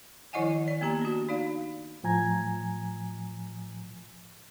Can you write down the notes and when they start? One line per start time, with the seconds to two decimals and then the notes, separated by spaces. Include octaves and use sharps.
0.33 D#3 F3 E4 D#5 F#5 G#5
0.68 D5
0.81 A#3 B3 G4 A#5
1.02 D4 F#4
1.29 D#4 D5 F5
2.04 A2 F3 G#5 A#5 G#6